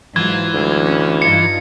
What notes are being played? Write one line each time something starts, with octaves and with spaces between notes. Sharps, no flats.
G#2 E3 F#3 F4 G#6
D2
C#4
G2 D#4 F4 C#7